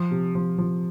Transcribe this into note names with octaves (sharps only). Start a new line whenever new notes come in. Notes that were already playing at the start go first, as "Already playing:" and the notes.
Already playing: F3
C3
F3
F3